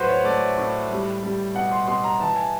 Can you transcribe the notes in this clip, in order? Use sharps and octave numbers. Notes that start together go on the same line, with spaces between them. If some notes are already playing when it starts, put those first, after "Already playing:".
Already playing: A2 F#3 F#4 B4 C5
C#5
A3 D5
A2
G3
G3
B2 F#5
C6
B2 C6
A#5
E3 A5
G#5